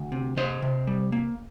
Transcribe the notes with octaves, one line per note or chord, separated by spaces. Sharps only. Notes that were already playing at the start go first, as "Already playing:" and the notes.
Already playing: D2
C3
C3 C5 D#5
C3
G3
A#3